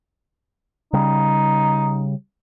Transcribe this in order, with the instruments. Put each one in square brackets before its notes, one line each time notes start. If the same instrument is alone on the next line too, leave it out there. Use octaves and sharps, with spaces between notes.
[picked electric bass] C#3 G3 [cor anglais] D#4